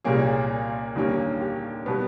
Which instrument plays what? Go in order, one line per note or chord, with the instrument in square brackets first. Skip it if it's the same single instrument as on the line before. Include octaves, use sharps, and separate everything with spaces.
[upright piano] C2 A#2 G3 A#3 C#4 G#4
D#2 D3 G3 A#3 C#4
G4
B2 G3 B3